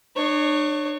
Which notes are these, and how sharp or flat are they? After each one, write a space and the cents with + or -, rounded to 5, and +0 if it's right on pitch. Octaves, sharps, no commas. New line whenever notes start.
D4 +40 C#5 +0